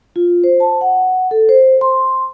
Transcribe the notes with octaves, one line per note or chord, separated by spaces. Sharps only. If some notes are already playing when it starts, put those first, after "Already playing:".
F4
C5
A5
F#5
A4
C5
C6